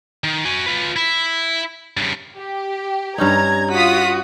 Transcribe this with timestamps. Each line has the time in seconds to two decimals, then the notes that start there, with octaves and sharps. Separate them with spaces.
0.24 D#3
0.45 F#4 G#5
0.66 F4 B4
0.96 E4
1.97 G2 C#3
2.35 G4
3.18 G2 C#4 D#4 A#5 G#6
3.71 F4 F#4 D#6 B6